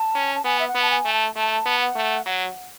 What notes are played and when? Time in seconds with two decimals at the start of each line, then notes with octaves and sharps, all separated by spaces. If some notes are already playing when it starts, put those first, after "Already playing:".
Already playing: A5
0.15 C#4
0.35 A5
0.45 B3 G#5
0.59 E5
0.68 F#5
0.75 B3
0.82 A5
0.90 G#5
1.05 A3
1.13 A5
1.35 A3 A5
1.66 B3
1.81 F#5
1.96 A3
2.26 F#3 F#5